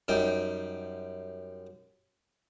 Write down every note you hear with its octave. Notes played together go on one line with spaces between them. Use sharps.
F#2 G3 D#4 G5